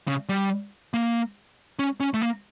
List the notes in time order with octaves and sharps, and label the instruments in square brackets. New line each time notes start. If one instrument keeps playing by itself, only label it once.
[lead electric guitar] C#3
G3
A#3
C#4
C#4
A3
A#3